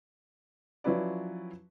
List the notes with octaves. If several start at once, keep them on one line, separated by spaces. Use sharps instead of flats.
F3 F#3 C#4 E4 B4 D5